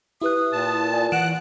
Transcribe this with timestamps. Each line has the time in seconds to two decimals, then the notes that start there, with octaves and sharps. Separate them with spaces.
0.22 E4 G4 B4 D#6 F#6
0.53 A#2 A5
0.94 D5 G#5
1.12 E3 F#5 F#6 D7 E7